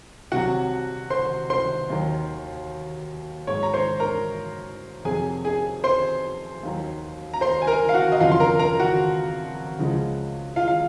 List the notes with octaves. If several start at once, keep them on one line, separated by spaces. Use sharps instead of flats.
C2 C3 F#3 F#4 F#5
C5 C6
C5 C6
D#2 D#3 F#3
G#2 F#3 C#5 C#6
A#5
C5 C6
A#4 A#5
F2 C3 F#3 G#4 G#5
G#4 G#5
C5 C6
D#2 D#3 F#3
A#5
C5 C6
G#5
A#4 A#5
F5
F#4 F#5
D#5
F2 C#3 F#3 F4 F5
C6
A#4 A#5
A#4 A#5
F#4 F#5
C#2 C#3 F3 G#3
F4 F5
F5